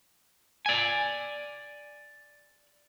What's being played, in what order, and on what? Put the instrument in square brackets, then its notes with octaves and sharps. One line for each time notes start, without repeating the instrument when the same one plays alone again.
[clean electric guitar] D5 G#5